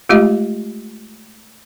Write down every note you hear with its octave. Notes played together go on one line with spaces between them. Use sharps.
G#3 A3 F4 G4 D#5